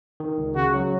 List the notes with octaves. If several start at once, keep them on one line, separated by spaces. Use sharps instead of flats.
D#3
C#2
C#3 F#4
F#3